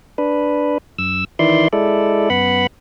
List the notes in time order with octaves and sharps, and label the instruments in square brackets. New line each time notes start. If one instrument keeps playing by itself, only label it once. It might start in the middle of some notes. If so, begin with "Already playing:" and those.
[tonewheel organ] D4 B4
F#2 E6
D#3 E3 E4 D5 C6
G#3 E4 A4 D5
F#2 B3 F#5 B5